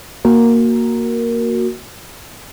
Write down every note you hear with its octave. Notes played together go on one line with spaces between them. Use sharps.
A#3 F#4 A#4